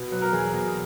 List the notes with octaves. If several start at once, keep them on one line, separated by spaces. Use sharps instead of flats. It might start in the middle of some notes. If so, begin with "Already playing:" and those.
Already playing: B2
F#3 B4
A#4
E2 G#4
B2